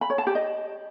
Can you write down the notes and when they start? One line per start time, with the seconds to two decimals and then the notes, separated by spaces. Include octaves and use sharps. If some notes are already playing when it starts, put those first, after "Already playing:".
0.01 B5
0.10 C#5
0.18 A5
0.27 G4
0.35 D#5